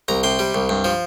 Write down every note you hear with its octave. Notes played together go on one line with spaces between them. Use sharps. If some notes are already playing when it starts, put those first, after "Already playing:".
C2 A#5
C3 C6
G3
C2
G2
F3